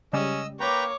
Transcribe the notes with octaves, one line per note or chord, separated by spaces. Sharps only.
C#3 G3 G#3 C#4 D#5 E6
A#3 B4 C#5 G5 A#5 D6